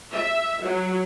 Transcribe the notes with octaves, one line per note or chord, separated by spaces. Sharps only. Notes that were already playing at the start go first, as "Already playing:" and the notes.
E5
F#3